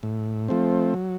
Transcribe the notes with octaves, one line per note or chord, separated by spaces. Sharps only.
A2
F3 A3 C4
F#3